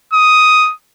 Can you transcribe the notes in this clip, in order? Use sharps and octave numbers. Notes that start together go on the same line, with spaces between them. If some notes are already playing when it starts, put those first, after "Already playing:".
D#6